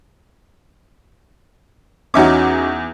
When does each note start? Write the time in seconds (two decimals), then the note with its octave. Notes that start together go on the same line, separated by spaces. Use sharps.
2.14 E2 C#4 D#4 F#4 E5 D6